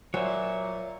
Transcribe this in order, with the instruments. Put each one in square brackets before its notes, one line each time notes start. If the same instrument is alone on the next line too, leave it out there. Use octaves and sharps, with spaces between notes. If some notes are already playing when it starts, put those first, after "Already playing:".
[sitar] A#2 [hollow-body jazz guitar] F#3 [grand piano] A#4 C5 G#5 [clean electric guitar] C#5 E5